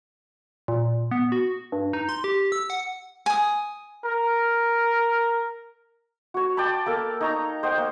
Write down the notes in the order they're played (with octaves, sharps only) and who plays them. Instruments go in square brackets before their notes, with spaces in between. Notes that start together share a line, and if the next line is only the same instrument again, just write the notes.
[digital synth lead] A#2
B3
F#4
G2
D#4
C6
G4
E6
F#5
[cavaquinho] G#5 D#6
[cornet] A#4
[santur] F#4 C#5
D5 G5 A5 B5
A#3 A4 A#4
D#4 C#5 A#5
C5 D#5 F#5 G5
A#3